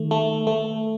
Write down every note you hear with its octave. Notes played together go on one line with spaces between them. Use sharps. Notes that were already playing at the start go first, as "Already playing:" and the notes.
Already playing: D#3 A3
A3
A3